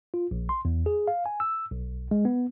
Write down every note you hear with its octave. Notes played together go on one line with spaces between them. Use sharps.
F4
A#1
C6
E2
G#4
F5
G#5
E6
B1
G#3
B3